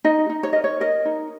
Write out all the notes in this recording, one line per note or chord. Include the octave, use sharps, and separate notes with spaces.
D#4 D#5
D#4
C#5
A#4 D#5
C#5
A#4 D#5
D#4